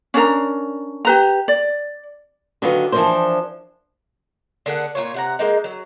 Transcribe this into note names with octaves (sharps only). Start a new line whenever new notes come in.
C#4 D4 A#4 A#5
G4 B4 A#5
D5
D3 D#3 F#3 F4 B4
E3 F3 D4 A#4 C5
D3 A#3 G#4 F#5
A#2 F3 F4 C#5
C3 F#5 A#5
G#3 A#3 D#4
F#3